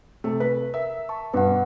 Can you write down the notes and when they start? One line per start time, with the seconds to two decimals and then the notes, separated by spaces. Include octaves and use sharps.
0.24 C3 A3
0.40 B4
0.74 A#4 E5
1.09 A5 C#6
1.33 G2 B2 B4 F#5